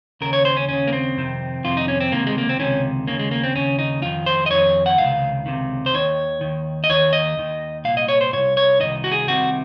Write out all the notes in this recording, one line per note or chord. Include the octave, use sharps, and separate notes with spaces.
D#2 C#3 A#4
C#5
C5
C#4
D#2 C#3 C#4
A#3
C4
F2 C3 D#3
F2 C3 D#3 F4
D#4
C#4
C4
C#2 C3 D#3 A#3
G#3
A#3
C4
C#2 C3 D#3 C#4
D#2 C#3 A#3
G#3
A#3
C4
D#2 C#3 C#4
D#4
F2 D#3 F4
C5
D#5
F2 D#3 C#5
F#5
C#2 C3 D#3 F5
C#2 C3 D#3
C5
D#2 D#3 C#5
D#2 D#3
D#5
D#2 D#3 C#5
D#5
D#2 D#3
C2 A#2 F5
D#5
C#5
C5
C2 A#2 C#5
C#5
C2 C3 D#3 D#5
F#4
G#4
C2 C3 D#3 F#4